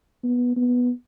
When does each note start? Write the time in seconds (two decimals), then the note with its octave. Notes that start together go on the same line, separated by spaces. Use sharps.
0.24 B3
0.56 B3